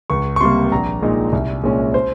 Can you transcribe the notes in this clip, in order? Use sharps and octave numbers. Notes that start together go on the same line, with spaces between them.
C#2 C#6
C#6
C3 G3 A#3 C6
A#1 A#5
A#2 G#3 D#4
C2
A#2 G#3 C#4
C5